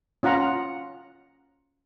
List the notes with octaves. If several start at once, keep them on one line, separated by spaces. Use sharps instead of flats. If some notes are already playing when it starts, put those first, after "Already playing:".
C#4 F4 F#5 A#5